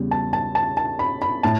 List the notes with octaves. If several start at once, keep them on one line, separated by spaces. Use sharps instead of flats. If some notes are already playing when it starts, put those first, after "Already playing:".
Already playing: E2 C#3 G3
A5
A5
A5
A5
B5
B5
A2 A5